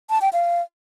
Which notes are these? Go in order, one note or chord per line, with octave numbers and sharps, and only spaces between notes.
A5
G5
F5